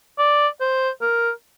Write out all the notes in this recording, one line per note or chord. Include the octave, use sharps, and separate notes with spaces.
D5
C5
A#4